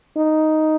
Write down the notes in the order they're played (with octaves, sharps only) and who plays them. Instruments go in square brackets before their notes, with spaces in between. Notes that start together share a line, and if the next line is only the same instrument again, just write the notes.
[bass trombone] D#4